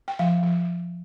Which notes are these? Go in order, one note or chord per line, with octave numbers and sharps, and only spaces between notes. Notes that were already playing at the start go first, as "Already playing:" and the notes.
G5
F3 F5
F3